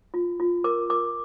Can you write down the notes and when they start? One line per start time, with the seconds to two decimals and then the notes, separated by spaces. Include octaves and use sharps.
0.14 F4
0.40 F4
0.64 A#4 D6
0.90 A#4 D6